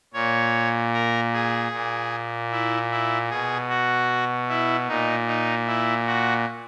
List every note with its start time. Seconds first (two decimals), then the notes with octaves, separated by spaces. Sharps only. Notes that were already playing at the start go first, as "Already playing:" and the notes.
0.14 A#2 C#5
0.93 A#4
1.33 G#4
1.72 A#2
2.51 E4
2.90 E4
3.30 B2 G#4
3.69 F#4
4.48 E4
4.87 A#2 D#4
5.27 D#4
5.66 E4
6.06 F#4